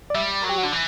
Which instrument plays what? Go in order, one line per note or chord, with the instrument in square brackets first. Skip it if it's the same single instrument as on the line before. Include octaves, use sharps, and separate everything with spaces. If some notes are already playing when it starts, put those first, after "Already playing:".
[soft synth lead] D5
[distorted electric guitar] G3 [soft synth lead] E5
[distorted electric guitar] F#3 [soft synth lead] A#4
[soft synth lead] G4
F#4
[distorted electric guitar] D3
E3